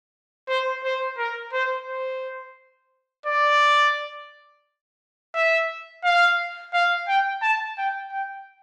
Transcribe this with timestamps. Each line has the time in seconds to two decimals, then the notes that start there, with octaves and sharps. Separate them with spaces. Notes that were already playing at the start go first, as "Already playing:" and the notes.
0.49 C5
0.84 C5
1.18 A#4
1.53 C5
1.87 C5
3.26 D5
5.34 E5
6.04 F5
6.74 F5
7.08 G5
7.42 A5
7.78 G5
8.12 G5